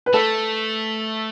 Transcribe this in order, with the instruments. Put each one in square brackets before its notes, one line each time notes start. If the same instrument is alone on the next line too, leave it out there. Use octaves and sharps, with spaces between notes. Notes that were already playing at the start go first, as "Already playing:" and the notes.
[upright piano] B4
[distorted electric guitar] A3 [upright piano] A4